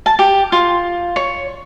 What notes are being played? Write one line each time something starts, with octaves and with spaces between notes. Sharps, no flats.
A5
G4
F4
C#5